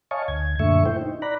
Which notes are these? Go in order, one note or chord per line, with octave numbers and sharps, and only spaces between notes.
C#5 D#5 F5 G#5 A5 C#6
D2 G#6
F#2 A#2 D3 A3 E5 C#6
E4 C5 G5
D#4
D5 A#5 B5 F#6